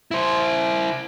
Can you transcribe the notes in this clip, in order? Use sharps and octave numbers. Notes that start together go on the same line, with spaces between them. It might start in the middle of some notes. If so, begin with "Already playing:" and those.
E4 C5